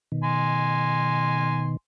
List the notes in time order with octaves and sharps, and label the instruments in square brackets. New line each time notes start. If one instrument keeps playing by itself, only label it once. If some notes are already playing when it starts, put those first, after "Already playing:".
[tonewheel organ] B2 D#3
[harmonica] G#5 C6